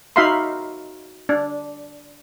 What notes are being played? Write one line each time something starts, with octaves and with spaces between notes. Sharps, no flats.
D#4 F#4 E5 F5 B5 C6
D4